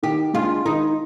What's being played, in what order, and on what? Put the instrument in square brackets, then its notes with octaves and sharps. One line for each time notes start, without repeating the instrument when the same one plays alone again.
[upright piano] D#3 [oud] G4
[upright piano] G#3 D4 [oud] F4
[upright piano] D#3 [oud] D#4